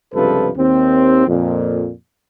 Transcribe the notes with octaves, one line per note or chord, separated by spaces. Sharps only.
C#2 G2 C3 F3 A4 B4
D#2 C4
F2 A#2